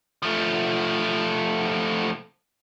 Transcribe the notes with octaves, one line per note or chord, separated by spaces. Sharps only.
F3 A3